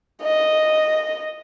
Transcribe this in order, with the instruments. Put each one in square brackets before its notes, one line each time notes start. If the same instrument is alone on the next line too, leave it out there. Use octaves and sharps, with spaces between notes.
[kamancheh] D#5